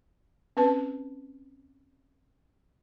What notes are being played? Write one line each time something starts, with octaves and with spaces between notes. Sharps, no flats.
C4 C#4 B4 A5